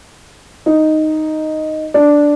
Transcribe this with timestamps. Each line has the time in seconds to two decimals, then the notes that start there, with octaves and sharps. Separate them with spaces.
0.66 D#4
1.94 D4